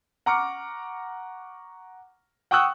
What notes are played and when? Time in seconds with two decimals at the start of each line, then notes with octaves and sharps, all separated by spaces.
0.26 F#5 A#5 C#6 D6 F6 C#7
2.51 F#5 G5 C#6 D#6 E6 F#6